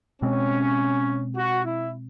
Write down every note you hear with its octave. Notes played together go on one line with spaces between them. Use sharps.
B2 G#3 C4 C#4
F#4
E4